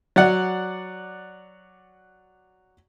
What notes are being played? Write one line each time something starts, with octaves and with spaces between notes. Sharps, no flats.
F#3 D5 F#5